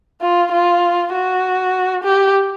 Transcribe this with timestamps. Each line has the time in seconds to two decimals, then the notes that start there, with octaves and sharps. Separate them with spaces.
0.21 F4
0.52 F4
1.13 F#4
2.04 G4